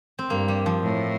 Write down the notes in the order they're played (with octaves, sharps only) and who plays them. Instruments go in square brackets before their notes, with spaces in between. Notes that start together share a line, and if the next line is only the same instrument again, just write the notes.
[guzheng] C4
[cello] G2 [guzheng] A#3
[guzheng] G3
F3
[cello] A2